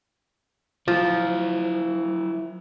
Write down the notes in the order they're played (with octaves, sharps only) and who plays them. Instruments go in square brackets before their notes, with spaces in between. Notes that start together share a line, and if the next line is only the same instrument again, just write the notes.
[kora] F3 [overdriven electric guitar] F#3 E4